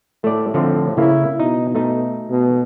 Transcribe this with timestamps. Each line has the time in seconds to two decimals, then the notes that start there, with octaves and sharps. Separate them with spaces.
0.24 A2 A3 D5
0.54 D3 F3 C4
0.97 C#3 A#3 E4
1.39 B2 D#4
1.75 A3 D#4
2.30 B2